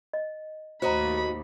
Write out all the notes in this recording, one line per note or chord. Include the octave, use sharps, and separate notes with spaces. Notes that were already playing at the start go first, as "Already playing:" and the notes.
D#5
D#2 A2 F#4 C5 D#5 A#5 B5